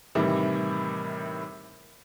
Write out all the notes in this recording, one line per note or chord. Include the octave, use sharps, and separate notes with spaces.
A2 C3 D#3 E3 G3